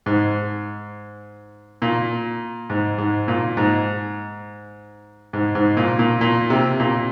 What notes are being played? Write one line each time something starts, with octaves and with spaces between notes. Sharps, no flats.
G#2
A#2
G#2
G#2
A#2
G#2
G#2
G#2
A#2
A#2
A#2
C3
A#2